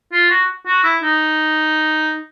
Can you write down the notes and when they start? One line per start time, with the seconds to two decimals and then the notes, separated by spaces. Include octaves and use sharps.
0.12 F4
0.30 F#4
0.66 F#4
0.84 E4
1.02 D#4